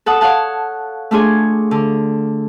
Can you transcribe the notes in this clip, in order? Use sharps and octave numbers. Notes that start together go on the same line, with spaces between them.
A4 F#5 A5 D#6
C#5 F5 F#5 A5
A3 D4 F4 G#4 C#5
D3